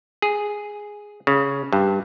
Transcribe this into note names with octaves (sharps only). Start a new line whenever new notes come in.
G#4
C#3
G2